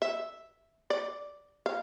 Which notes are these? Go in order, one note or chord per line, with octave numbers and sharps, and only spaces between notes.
E5
D5
F5